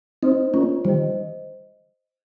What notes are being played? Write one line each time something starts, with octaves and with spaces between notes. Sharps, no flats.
C4 D#4 C5 D#5
A#3 C#4 F4
D#3 G3 C5 D#5